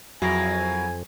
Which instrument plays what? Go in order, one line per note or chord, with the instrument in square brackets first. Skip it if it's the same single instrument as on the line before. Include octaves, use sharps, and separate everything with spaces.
[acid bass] F2 [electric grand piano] F#3 [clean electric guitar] E4 G#4 A#4 [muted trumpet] G#5